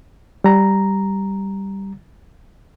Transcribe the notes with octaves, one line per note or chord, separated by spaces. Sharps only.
G3 A#5